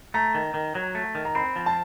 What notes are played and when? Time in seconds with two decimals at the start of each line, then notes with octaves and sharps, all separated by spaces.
0.14 A3 A#5
0.35 D#3
0.54 D#3
0.75 F#3
0.95 A3
1.15 D#3
1.25 A#5
1.35 C4 B5
1.56 F3
1.66 A5